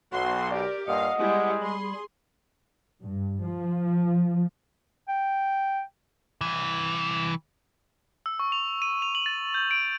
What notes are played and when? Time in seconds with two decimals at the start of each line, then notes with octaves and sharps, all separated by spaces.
0.13 B1 F#4 C6
0.51 G4 A#4 D5
0.87 G2 A#2 D#5 F5 F#5
1.19 G3 G#3 B3 E4
1.62 G3 G#4 B5 C6
3.02 G2
3.41 F3
5.08 G5
6.41 C2 E3
8.26 E6
8.39 C#6
8.52 F7
8.82 D#7
9.02 F7
9.15 F#7
9.26 A6
9.54 G6
9.71 D7